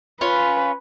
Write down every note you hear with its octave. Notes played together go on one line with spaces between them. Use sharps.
C#4 F4 B4